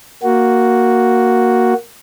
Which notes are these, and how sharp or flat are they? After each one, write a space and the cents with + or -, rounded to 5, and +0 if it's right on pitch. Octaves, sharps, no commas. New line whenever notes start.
A#3 +0 F#4 +0